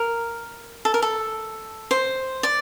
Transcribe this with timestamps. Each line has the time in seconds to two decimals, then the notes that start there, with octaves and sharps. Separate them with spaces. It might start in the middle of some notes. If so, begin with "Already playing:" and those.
Already playing: A#4
0.85 A4
0.94 A#4
1.02 A4
1.91 C5
2.43 D5